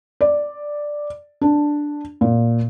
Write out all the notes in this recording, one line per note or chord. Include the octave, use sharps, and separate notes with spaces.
D5
D4
A#2